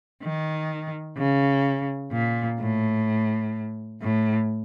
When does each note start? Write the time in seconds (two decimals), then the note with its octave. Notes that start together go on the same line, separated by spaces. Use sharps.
0.23 D#3
1.17 C#3
2.11 A#2
2.60 A2
4.01 A2